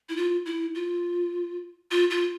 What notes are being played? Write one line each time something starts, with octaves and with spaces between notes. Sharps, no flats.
E4
F4
E4
F4
F4
F4